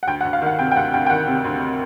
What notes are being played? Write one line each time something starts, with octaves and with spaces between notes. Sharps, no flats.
F#5
D2 G5
F#5
D2
F5
D#3 F#5
C3 G5
G5
D2 F#5
D2 G5
G5
D#3 F#5
C3
D2